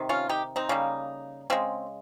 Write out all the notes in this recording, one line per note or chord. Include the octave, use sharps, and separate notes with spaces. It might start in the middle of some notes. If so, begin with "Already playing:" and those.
Already playing: C3 D#3
C#4 F4
D#4 G4
C4 D#4
C#3 G3 A#3
C#3 G#3 C4